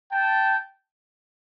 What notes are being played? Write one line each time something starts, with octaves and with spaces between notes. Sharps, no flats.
G5 A5